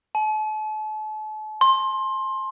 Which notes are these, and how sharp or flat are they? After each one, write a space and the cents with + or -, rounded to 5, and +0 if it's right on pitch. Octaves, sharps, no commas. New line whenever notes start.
A5 -40
C6 +20